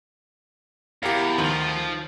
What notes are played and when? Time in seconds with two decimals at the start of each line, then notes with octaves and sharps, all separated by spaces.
1.03 E2 G4 A#4 F5
1.38 D2 D#3 F3